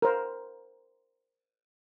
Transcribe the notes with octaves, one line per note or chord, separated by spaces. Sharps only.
A#4 C5